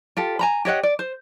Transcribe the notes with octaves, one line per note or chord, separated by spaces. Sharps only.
F4 G4 A4
G#5 A#5 B5
G4 C#5 D#5 F#5
D5
C5